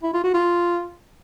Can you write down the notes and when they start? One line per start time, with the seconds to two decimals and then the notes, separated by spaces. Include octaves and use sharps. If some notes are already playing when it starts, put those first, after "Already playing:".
0.03 E4
0.13 F4
0.24 F#4
0.34 F4